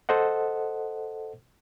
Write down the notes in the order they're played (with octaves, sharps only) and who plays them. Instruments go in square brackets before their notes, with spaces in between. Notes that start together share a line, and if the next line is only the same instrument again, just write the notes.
[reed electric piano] A4 C5 D#5 F#5